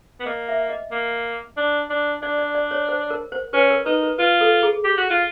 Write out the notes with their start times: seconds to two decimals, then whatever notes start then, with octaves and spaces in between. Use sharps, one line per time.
0.20 B3
0.26 A#3 D#5
0.49 E5
0.70 D#5
0.92 A#3
1.57 D4
1.90 D4
2.22 D4 D5
2.38 D5
2.55 D5
2.71 C#5
2.89 C5
3.10 A#4
3.32 C5
3.53 C#4 B4
3.70 A#4
3.86 D#4 B4
4.03 B4
4.18 F4 B4
4.41 A4
4.63 G#4
4.84 G4
4.97 F#4
5.10 F4